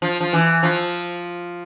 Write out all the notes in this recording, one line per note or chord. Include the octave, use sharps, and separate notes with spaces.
F3
F3
E3
F3